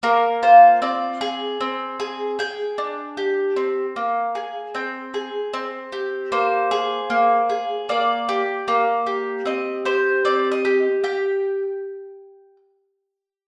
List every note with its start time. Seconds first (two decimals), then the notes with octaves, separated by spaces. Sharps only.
0.03 A#3 A#4
0.43 F4 C5
0.82 C4 D5
1.21 G#4
1.61 C4
2.00 G#4
2.39 G#4 G5
2.78 D4
3.17 G4
3.56 C4
3.96 A#3
4.35 G#4
4.74 C4 G5
5.14 G#4
5.53 C4
5.92 G4
6.32 A#3 C5
6.71 G#4
7.10 A#3
7.50 G#4
7.89 A#3 D5
8.29 G4
8.68 A#3
9.06 G4
9.45 C4 D#5
9.85 G4 C5
10.25 C4 D5
10.51 D#5
10.65 G4
11.04 G4 G5